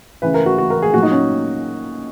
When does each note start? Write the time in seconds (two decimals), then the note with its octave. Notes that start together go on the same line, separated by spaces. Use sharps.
0.22 C#3 E3 B4
0.34 A#4
0.46 F#4
0.58 F#4
0.70 A#4
0.82 G#4
0.94 A#2 F#3 F#4
1.03 D#4
1.12 C#4